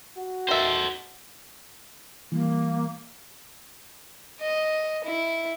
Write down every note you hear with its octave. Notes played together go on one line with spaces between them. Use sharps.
F#4
D#3 A4 C5 E5
E3 G3 A#3
D#5
E4